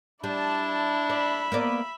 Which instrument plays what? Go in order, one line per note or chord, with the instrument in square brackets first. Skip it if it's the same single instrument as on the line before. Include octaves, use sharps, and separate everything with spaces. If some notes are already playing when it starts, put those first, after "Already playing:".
[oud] G3 [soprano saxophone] D4 [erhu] E4 [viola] D5 A5
[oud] D5 [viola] E5 B5
[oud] A#3 B3 D5